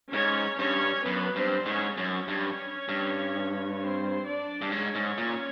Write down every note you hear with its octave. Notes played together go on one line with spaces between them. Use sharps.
G#2 C#4 C#5
G2 C#4 C#5
F#2 B3 B4
G2 C4 C5
G#2 C#4 C#5
F#2 C#4 C#5
G2
G2
C4 C5
D4 D5
G2
G#2 C#4 C#5
G#2
A#2